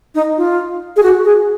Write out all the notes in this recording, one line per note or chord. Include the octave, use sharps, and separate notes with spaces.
D#4
F4
G#4
F#4
G#4